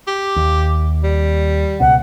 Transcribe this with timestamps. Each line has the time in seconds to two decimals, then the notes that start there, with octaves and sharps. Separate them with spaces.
0.08 G4
0.36 D#2
1.04 G3
1.80 C#2 B2 F#5